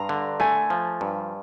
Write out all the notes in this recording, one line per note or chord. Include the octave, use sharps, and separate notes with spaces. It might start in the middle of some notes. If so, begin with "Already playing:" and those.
Already playing: G2 A#5 C6
D3
A3 G#5
F3
G2